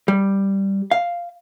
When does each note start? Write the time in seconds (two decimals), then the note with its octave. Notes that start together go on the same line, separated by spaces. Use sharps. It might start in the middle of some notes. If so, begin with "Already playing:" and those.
0.08 G3
0.91 F5